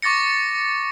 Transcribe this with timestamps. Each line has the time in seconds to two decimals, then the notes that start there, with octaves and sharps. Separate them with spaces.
0.02 C#6 D6 A6 A#6 C#7